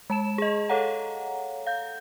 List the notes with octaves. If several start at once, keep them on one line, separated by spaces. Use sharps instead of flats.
G#3 A5 E7
G#4 D#5
A4 C#5 F5 F#5 A#5
F5 G6